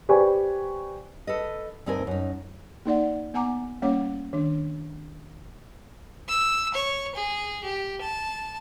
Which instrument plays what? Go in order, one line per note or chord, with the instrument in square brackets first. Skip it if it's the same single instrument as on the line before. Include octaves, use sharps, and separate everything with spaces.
[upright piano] G4 B4 C5 D5 G#5 C#6
[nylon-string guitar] A4 B4 D#5
D2 G2 C4 D#4 A#4 G#5
F#2 D#4
[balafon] A#3 D#4 D5 F#5
B3 F#5 G#5 A#5 D6
G3 A#3 C#4 C#5 F#5 D6
D#3 D4
[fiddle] E6
C#5
G#4
G4
A5